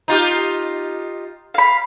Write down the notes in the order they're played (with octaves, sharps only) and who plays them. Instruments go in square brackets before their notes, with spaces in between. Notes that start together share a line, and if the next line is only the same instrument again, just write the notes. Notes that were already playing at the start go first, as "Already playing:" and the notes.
[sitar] D#4 F4 G4
[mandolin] F5 B5